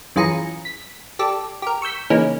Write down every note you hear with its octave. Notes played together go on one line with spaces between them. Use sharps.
F#2 E3 F4 G#4 A#5 C#7
B6
G4 A4 D5
G4 A#4
C#6 E6 G6 B6
C#3 E3 A#3 C#4 D#4